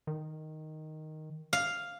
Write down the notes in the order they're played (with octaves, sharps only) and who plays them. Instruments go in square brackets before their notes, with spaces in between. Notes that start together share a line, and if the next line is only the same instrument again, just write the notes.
[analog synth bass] D#3
[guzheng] F5